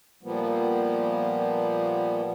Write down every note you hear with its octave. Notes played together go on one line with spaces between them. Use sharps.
A#2 F3 G3 A#3 B3